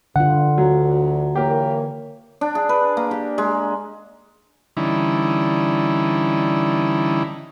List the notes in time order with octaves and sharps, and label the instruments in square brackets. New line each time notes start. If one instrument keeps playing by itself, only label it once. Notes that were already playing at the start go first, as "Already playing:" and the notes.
[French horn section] G2 [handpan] D3 F4 [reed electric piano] F#5
[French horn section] D2 [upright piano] F#3
[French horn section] E3 A#3 C#5 [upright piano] G4 A#4
[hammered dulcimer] D4
G#4
B4
A#3
G4
G#3
[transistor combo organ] D3 E3 G3 C#4 D#4 E4